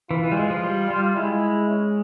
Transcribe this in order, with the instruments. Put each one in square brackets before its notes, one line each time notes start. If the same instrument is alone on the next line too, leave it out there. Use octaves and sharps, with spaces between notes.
[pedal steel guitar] E3 [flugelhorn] F4
[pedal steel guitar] E3
G3
G#3
F3
G3
G3
[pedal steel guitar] G#3 [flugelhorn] E4
[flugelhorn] C#4